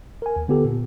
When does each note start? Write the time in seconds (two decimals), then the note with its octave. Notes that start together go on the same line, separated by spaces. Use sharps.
0.22 A#4 G#5
0.36 D#2
0.48 D3 B3 F4 G4 A4
0.65 A#2